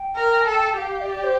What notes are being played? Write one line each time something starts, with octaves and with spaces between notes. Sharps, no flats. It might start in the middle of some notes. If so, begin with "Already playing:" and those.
Already playing: G5
A#4
G5
A4 A5
G5
G4 F5
D5
C5